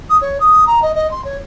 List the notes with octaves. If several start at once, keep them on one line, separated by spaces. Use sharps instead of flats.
D#6
C#5
D#6
A#5
D#5
D#5
C6
C#5